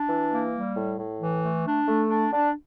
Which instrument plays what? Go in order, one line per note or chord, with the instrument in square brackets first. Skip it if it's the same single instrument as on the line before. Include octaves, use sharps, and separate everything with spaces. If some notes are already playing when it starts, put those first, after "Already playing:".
Already playing: [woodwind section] D4
E3
A#3
G3
A2
A2
E3
A3
D4
A3
D4
D4